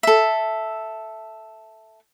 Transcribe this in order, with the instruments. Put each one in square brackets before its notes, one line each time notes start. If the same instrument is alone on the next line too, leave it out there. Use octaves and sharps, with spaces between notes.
[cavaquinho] A4 E5